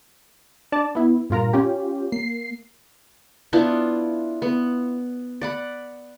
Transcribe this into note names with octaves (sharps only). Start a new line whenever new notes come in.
D4 D5 A5
B3 E4
G2 A#2 F4 A#4 A#5
C#4 F4 G4
A#3 C7
B3 D4 E4 F4
B3
D5 F#5 B5